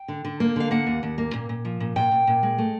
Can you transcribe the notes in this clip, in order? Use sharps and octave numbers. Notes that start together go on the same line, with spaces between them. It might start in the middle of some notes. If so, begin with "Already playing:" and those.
Already playing: G5
D3
D3
A#3
D3 F5
A#3 F#5
D#2
D#2
A#3
A#2
A#2
F3
A#2
A#2 G5
A#2
A#2
G#3
A3